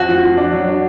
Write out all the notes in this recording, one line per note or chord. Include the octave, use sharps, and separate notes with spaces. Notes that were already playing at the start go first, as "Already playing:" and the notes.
Already playing: F2 F#4
F3
F3
D4
F#3
D4